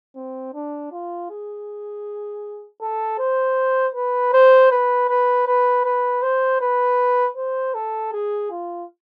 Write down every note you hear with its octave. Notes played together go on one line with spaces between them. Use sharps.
C4
D4
F4
G#4
A4
C5
B4
C5
B4
B4
B4
B4
C5
B4
C5
A4
G#4
F4